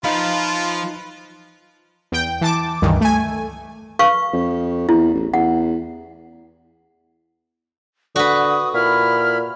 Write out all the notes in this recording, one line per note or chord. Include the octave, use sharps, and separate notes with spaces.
F3 D#4 F4 B4 F5 B5
E2 G5
E3 A5 D6
C#2 G2 D#3 E3
A3 G#5
B4 F5 C#6
F2
E2 E4
A1
E2 F#5
D3 F#4 B4 D#6
A#2 E4 B5 F6